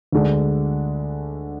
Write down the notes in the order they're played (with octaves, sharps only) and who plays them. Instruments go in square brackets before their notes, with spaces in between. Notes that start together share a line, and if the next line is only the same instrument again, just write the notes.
[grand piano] D2 D3 G#3 D4